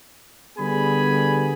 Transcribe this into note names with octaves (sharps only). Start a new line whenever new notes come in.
D3 G3 B3 G#4 G#5 B5